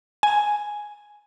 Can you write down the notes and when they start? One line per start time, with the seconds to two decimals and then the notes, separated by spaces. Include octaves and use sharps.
0.23 G#5